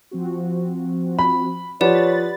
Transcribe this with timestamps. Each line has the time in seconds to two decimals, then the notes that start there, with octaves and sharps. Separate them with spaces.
0.11 F3 C4 F#4
1.19 B5
1.81 F3 G4 B4 C#5 D5 F#5 B5 A6